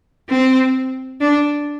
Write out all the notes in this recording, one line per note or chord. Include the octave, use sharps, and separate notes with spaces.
C4
D4